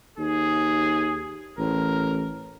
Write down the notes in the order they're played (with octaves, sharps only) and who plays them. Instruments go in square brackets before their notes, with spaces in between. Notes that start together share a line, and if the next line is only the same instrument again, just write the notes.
[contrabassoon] D#2 [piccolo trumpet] G#4
[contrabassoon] A1 [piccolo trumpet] A#4